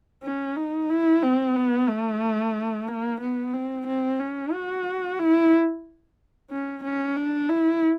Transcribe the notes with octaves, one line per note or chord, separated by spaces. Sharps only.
C#4
D#4
E4
C4
B3
A3
A#3
B3
C4
C4
C#4
F#4
E4
C#4
C#4
D4
E4